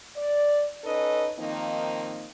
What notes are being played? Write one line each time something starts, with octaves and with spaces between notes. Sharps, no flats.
D5
C#4 D#4 A4 B4 D#5
D#3 F3 A#3 C4 D#4